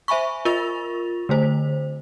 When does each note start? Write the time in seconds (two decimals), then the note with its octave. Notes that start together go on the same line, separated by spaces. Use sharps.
0.08 C5 E5 G#5 B5 C#6
0.45 F4 A#4 C#6 A6 F7
1.29 D3 A3 C5